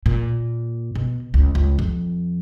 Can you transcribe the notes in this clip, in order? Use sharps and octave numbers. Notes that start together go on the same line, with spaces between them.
A#2
B2
C#2
C#2
F2